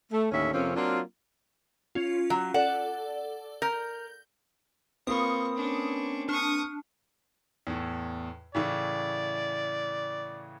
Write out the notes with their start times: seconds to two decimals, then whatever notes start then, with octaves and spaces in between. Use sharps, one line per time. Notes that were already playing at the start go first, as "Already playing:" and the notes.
0.12 A3
0.32 D#2 A2 D3 C#4 C#5 E5
0.53 F2 C3 A#3 C4 C#4
0.76 F#3 A#3 C4 D4 F4
1.95 C#4 F4
2.30 F#3
2.54 A4 D5 F#5
3.62 A#4 G6
5.07 A#3 C4 F4 B4 B5 C#6 D#6
5.56 C#4 D4
6.29 D4 C#6 D#6 F6
7.67 E2 A2
8.55 A2 C#3 E3 D5